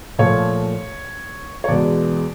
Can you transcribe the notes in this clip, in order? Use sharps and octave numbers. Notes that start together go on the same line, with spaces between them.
A#2 F3 A3 C#5
C#5
E2 B2 G#3 D5